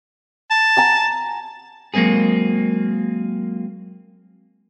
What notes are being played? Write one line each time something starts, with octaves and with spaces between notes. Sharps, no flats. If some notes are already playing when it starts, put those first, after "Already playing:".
A5
F#5 G#5 A#5
F#3 G#3 A#3 C4 G#4